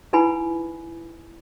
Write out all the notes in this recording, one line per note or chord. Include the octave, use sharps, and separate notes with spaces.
D#4 E4 B4 F#5 G#5 B5